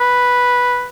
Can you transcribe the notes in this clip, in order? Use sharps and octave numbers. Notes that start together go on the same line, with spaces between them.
B4